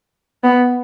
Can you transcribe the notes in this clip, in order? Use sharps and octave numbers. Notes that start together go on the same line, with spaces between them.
B3